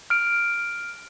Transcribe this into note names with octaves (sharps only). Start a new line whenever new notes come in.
F6 D7